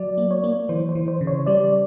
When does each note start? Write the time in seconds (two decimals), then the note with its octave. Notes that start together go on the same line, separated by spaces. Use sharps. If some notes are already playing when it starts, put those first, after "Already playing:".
Already playing: F#3 D5
0.18 A#3
0.31 C#5
0.44 A#3
0.69 E3 C5
0.89 C5
0.95 E3
1.08 C5
1.21 C#3
1.27 C#5
1.46 G3 D5